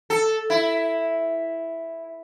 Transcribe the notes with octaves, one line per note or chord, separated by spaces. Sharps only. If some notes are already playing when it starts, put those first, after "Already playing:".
A4
E4